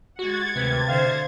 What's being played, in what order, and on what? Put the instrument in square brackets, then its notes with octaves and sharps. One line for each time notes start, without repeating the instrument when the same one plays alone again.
[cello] G#3 F#5 [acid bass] F#4 [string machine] G#6 A6
[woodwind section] D2 D#3 B4 [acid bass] C3
[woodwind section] B2 F5 [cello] D3 C5